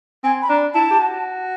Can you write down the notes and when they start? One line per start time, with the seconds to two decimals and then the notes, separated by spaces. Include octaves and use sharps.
0.24 C4 G#5
0.42 B5
0.49 D4 A#5
0.74 E4 A5
0.90 G4
0.99 F#4